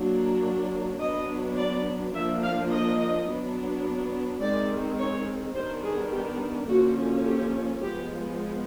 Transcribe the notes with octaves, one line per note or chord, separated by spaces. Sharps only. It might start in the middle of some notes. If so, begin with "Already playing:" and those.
Already playing: F#3 A#3 D4
F#3 B3 D4 D#5
D5
F3 A#3 D4 E5
F5
D#5
F#3 B3 D4
D#3 G#3 C4 D5
C#5
D#3 G3 B3 D4 C5
G#4
G4
D3 F3 A#3 C#4 F#4
G4
F3 G#3 B3 G4